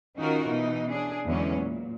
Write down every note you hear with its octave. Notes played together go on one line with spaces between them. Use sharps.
D#3 C#4 D#4 F4 F#4 A#4
B2 E3 D#4
C#4 D4 G#4
E2 D3 F#3 G#3 B3 C#4
A#2